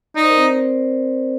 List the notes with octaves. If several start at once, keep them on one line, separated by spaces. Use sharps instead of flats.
D#4 D5
C5
A#4
C4 C5